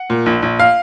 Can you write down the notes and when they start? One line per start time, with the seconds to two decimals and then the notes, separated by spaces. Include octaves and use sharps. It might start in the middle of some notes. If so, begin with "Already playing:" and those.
Already playing: F#5
0.10 A#2
0.26 A#1
0.42 A#1
0.60 F5